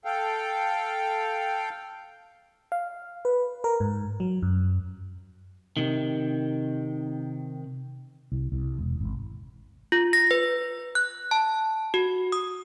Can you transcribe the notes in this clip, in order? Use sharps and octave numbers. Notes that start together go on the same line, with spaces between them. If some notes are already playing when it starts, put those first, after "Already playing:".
A4 F5 G5
F5
B4
A#4
G#2
F#3
F#2
C3 D#3
C2
C2
E1
G#1
F4
A#6
B4
F#6
A5
F#4
D#6